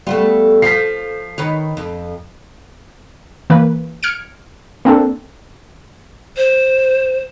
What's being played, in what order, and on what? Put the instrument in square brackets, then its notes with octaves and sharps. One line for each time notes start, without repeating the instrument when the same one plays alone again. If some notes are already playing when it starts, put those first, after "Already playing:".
[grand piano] G3 [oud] A3 B3 F4
[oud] F3 [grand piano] B6 C7
[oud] D#3 B4 C#5
F2
[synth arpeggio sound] E3 A#3 B4
F6 G#6 C#7 D7
A#3 C4 D4 A4
[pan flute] C5